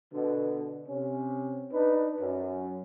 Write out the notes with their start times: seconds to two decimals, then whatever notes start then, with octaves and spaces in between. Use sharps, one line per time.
0.12 B2 D3
0.86 C3 C#4
1.71 D4 D#4 B4
2.19 F#2